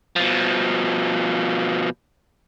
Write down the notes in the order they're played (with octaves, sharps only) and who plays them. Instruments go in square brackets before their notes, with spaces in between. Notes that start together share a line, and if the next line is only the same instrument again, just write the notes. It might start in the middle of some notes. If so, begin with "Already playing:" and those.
[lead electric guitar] B2 F3